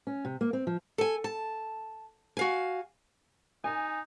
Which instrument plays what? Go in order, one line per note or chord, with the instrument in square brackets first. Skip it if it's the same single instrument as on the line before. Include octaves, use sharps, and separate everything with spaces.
[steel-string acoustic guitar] C#4
C3
A#3
C4
F3
A4 G#5
A5
F#4 F5 G#5
[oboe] D#4 [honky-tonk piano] G#5